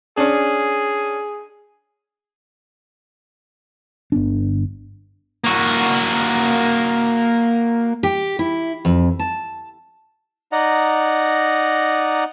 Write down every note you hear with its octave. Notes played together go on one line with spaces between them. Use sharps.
C#4 D4 G#4
G1 B3 D4
A#3 F#4
G4
E4
F2
A5
D#4 D5 D#5 F#5 A#5